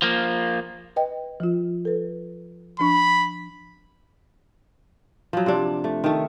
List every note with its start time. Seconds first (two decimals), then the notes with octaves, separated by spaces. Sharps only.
0.02 F3 A#3
0.96 B4 D#5 G5
1.40 F3 F4
1.85 A4 B4
2.80 F3 D4 B5 C#6
5.33 F3 F#3
5.46 C3 D4
5.84 A3
6.04 D#3 A3